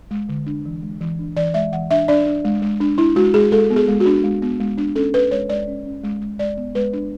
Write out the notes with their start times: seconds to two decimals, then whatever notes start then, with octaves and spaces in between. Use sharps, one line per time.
0.11 G#3
0.29 D3
0.46 D4
0.65 E3
0.82 G#3
1.01 E3
1.19 D4
1.37 E3 D5
1.54 G#3 E5
1.73 E3 F#5
1.91 D4 E5
2.08 D4 D5
2.26 D4
2.45 G#3
2.62 G#3
2.80 D4
2.98 D4 E4
3.16 G#3 F#4
3.34 G#3 G#4
3.52 G#3 A4
3.70 B3
3.76 G#4
3.88 G#3
4.00 F#4
4.06 D4
4.24 G#3
4.42 B3
4.60 G#3
4.78 D4
4.96 C#4 A4
5.14 C#4 B4
5.31 G#3 C#5
5.49 G#3 D5
5.68 C#4
5.86 C#4
6.03 G#3
6.22 G#3
6.39 G#3 D5
6.57 B3
6.75 G#3 B4
6.93 D4